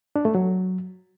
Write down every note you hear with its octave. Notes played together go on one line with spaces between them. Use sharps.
D4
A3
F#3